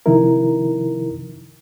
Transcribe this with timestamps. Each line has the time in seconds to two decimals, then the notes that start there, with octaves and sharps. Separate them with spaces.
0.06 C3 D#3 F3 D#4 E4 A#4